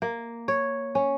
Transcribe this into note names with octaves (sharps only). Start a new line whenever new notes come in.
A#3
C#5
C#4